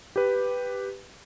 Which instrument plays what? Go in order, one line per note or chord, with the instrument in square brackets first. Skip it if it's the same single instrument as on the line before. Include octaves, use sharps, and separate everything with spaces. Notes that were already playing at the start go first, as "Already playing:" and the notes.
[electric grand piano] G4 B4